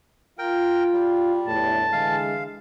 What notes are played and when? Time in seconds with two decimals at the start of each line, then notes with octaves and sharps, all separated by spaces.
0.39 F4 A#4 G5
0.94 G3
1.47 G1 E2 A2 A5
1.92 D3 E3 G#3 F5